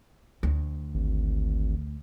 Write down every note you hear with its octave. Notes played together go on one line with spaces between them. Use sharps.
D2
G#1